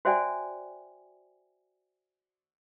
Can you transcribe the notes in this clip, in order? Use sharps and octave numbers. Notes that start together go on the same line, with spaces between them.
F#4 C5 D5 E5 G5 G#5